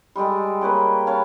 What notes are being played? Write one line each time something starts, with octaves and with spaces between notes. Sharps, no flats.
G3 G#3 G4 A4
A#3 B4 C#5 G5
C#5 F5 A5